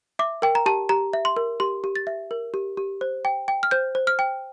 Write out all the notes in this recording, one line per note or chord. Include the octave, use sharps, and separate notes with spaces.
E5 D6
A#4 G5
A#5
G4 A5
G4 A#5
E5
C6
A#4
G4 C6
G4
A6
E5
A#4
G4
G4
C5
G5
G5
F6
C5 G6
C5
F6
G5